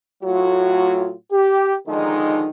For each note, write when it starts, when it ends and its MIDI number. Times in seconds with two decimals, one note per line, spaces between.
0.23 1.14 45
0.23 1.14 54
0.23 1.14 65
0.23 1.14 66
1.32 1.76 67
1.87 2.50 50
1.87 2.50 51
1.87 2.50 53
1.87 2.50 56
1.87 2.50 63